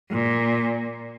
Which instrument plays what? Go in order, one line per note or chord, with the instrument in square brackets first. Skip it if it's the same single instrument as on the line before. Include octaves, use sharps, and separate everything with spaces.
[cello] A#2